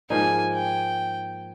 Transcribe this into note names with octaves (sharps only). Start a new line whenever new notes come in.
G#2 F3 A#3 D#4 G#5
G5